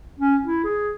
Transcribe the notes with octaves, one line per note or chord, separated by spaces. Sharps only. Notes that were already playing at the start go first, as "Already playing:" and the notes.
C#4
E4
G#4